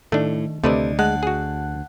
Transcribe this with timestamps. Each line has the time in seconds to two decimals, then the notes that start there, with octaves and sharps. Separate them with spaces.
0.12 A2 D#3 A3 D4
0.64 D2 C3 A3 B4 D5 D#5
0.99 G#3 F#5 A5 F#6
1.23 F#4 G#4